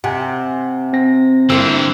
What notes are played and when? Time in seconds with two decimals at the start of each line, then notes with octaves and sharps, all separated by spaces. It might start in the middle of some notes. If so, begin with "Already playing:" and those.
0.04 C3 F#5 G#5
0.93 C4 A#6
1.50 G2 D3 E3 A#3 C4 E6